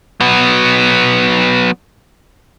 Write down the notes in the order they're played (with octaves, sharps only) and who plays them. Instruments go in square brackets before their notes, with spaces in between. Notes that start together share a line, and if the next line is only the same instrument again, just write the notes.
[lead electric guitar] F#3 B3